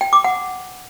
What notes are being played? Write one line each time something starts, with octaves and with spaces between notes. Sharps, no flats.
G5
D6
F#5